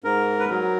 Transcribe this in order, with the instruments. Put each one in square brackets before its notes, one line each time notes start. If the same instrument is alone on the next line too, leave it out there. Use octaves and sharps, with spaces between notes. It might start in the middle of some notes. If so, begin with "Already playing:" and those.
[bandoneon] G#2 A#4
B4
F#3 A#4